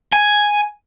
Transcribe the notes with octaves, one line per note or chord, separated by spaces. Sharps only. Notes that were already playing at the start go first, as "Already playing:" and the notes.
G#5